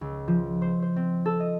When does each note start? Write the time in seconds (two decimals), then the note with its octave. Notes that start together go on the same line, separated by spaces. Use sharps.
0.01 C#2
0.28 F3
0.62 C5
0.82 C5
0.96 C4
1.26 A4
1.40 D#5